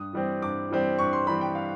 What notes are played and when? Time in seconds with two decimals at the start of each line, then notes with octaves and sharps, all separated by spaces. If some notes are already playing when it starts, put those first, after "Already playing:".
Already playing: G2 D#6
0.13 E3 G3 C4
0.42 G2 D6
0.71 E3 G3 C4
0.99 G2 C#6
1.13 C6
1.27 E3 G3 C4 B5
1.41 G5
1.55 F5